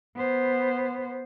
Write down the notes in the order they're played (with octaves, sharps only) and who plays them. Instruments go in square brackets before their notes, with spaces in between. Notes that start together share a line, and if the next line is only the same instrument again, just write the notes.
[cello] B3 C5